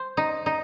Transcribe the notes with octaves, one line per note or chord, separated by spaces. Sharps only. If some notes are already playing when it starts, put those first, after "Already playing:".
Already playing: C5
D#4
D#4